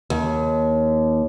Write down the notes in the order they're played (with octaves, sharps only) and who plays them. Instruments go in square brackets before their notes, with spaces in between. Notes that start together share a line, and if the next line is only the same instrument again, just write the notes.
[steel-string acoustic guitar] D#2